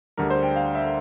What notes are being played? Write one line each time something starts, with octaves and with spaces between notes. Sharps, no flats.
D2 D3 G3 A#4
C5
G5
F5
E5